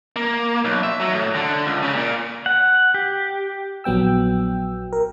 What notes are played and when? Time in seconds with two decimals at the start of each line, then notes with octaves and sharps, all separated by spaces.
0.16 A#3
0.65 B1
0.83 E5
0.99 F#3
1.14 A2
1.35 D3
1.66 C#2
1.83 C#3
1.95 A#2
2.46 F#5
2.94 G4
3.84 A#1 F#3 B3 G5 E6
4.93 A#4